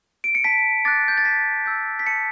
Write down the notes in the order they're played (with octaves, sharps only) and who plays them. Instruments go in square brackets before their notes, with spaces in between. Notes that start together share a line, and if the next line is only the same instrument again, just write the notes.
[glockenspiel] D7
C#7
A5 B6
D6 F#6 A6
G6
A6
A5 B6
E6 G6
B6
A5 C#7